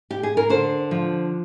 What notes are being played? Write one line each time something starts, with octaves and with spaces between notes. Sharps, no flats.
G4
G#4
A#4
D3 C5
F3